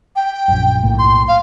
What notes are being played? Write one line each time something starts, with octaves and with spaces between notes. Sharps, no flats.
G5
A#1 F#2
B1 A2 A#3
C6
F5